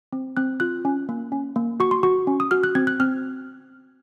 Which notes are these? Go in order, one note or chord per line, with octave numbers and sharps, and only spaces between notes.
C4
C4 F#6
F4 F#6
C#4
A#3
C#4
A#3
F#4 C#6
C6
F#4 C#6
C#4
D#6
F#4 F6
F#6
C4 G#6
F#6
C4 F6